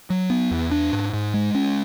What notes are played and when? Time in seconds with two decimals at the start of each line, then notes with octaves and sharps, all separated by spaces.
0.10 F#3
0.30 B3
0.51 E2
0.71 D4
0.93 G#2
1.14 G#2
1.34 G#3
1.55 C#4